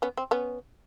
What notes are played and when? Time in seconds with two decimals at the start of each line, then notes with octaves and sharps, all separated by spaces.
0.02 B3 C#4
0.17 C4
0.31 B3 C#4